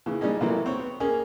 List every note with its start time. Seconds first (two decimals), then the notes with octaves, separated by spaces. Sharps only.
0.06 C#3 E3
0.21 G3 G#3 C#4 D#4
0.41 C3 E3 F#3 A3 A#3 E4
0.66 C4 C#5
0.79 B3
1.00 A#3 C#4 G#4 A#4